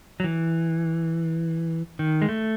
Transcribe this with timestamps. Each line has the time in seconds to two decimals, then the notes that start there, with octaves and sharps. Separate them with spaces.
0.20 F#3
0.24 E3
1.99 D#3
2.22 G#3
2.29 A3